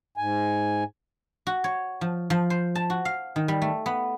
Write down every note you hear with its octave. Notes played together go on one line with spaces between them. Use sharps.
G#2 G#5
F#4
C#5
F3
F3
C5
A5
F#4
F5
D#3
G3
A3
B3